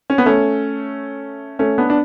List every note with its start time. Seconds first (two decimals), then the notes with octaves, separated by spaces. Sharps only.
0.10 C#4
0.18 B3
0.26 A3 C#4
1.59 A3 C#4
1.78 B3 D4
1.90 D4